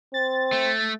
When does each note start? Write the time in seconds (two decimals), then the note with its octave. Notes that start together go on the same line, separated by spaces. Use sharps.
0.14 C4 A6
0.53 A3